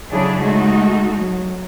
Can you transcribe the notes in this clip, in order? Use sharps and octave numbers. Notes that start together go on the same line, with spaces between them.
C#3 F#3 D4 E4 G#4 A4
G#3 A3 D#4 F#4
F#3